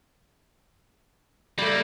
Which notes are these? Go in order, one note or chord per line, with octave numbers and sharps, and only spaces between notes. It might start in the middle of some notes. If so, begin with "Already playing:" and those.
G3 A3 A#3